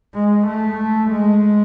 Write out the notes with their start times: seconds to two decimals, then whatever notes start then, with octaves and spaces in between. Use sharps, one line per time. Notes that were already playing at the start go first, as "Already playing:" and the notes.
0.15 G#3
0.47 A3
1.11 G#3